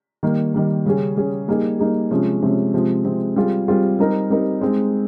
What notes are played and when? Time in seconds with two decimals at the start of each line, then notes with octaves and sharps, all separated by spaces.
0.23 D#3 G3 A#3
0.54 D#3 G3 A#3
0.86 C#3 G3 C#4 G#4
1.17 C#3 G3 C#4 G#4
1.48 G3 A#3 D#4 G#4
1.79 G3 A#3 D#4 G#4
2.11 C3 F3 G#3 C#4
2.42 C3 F3 G#3 C#4
2.74 C3 F3 G#3 C4
3.05 C3 F3 G#3 C4
3.36 G3 C4 F4 G#4
3.68 G3 C4 F4 G#4
3.99 G3 C4 D#4 A#4
4.30 G3 C4 D#4 A#4
4.61 G#3 C4 D#4